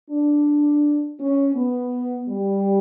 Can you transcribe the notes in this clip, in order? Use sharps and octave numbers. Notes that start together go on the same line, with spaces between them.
D4
C#4
B3
G3